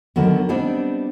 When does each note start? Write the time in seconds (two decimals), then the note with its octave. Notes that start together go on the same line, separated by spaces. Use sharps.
0.16 D3 D#3 F#3 B3
0.49 G3 B3 C4 D4 D#4